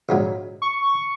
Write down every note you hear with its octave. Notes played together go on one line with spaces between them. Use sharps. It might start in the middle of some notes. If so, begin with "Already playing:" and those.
A#1 G#2 F#3
C#6